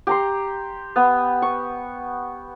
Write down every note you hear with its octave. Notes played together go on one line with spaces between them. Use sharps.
G4 A#5 C6
B3
C#6